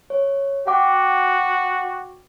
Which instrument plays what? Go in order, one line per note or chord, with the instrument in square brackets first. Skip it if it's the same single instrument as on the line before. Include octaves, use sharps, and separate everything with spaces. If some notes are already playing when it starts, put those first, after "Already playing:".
[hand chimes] C#5
[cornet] F#4 [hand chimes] F#5 G5 D6